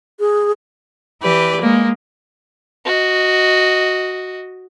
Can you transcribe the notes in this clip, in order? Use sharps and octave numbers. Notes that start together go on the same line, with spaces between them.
G#4
E3 G4 B4 D5
G#3 A#3
F#4 D#5